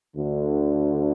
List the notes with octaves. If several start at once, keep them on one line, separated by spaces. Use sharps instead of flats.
D2 D3